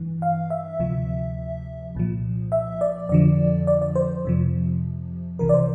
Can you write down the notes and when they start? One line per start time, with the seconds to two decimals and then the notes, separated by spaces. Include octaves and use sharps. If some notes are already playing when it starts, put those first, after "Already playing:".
Already playing: G2 E3
0.22 F5
0.50 E5
0.80 D2 C3 F3
1.95 C2 A#2 F3
2.52 E5
2.81 D5
3.09 F2 D3 F3 D5
3.67 D5
3.82 D5
3.96 C5
4.25 F2 C3 F3
5.39 C2 C3 E3 A#4
5.49 D5
5.54 C5